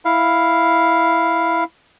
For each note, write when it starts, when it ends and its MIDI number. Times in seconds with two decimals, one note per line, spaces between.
0.05 1.64 64
0.05 1.64 77